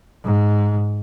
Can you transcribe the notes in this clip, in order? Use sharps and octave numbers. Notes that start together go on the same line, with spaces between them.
G#2